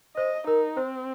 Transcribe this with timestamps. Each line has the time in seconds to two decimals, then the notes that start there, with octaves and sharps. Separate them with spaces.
0.17 C5 D#5
0.47 D#4 A#4
0.77 C4 C5